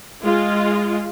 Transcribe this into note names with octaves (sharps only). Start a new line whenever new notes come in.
G#3 F4